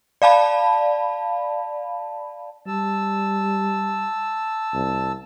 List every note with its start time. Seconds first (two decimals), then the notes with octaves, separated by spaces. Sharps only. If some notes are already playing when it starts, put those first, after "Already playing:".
0.22 D5 F5 A5 B5
2.67 G3 A5 E6
4.74 C2